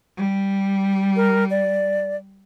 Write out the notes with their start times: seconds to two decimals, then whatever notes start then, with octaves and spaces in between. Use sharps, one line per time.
0.17 G3
1.16 A#4
1.50 D5